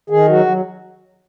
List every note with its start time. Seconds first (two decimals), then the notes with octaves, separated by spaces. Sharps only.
0.10 D#3 G#4
0.28 F#3 F#4
0.46 F#3